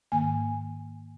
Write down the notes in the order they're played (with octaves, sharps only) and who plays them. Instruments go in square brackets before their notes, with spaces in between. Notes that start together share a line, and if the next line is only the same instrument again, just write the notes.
[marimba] G#2 D#3 A#3 G#5